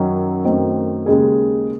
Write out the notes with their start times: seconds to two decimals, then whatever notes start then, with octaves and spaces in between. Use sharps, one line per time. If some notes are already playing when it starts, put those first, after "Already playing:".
Already playing: F#2 D#3 F#3 C#4
0.44 F#2 D#3 A3 C4
1.06 D#2 C#3 G#3 D#4 G#4